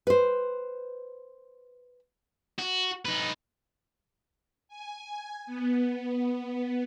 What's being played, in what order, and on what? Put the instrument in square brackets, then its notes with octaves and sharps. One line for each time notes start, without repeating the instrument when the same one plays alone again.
[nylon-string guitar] B4 C5
[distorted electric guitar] F#4
D#4 B4
[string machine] G#5
B3